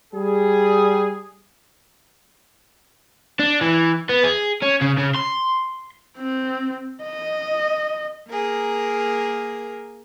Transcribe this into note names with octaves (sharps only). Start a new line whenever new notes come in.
G3 G#4
D4
E3
B3
G#4
C#4
C#3
C#3
C6
C4
D#5
A#3 G#4 A#4